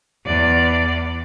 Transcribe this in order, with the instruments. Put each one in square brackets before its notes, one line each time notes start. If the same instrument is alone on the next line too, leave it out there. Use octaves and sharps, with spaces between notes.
[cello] E2 D5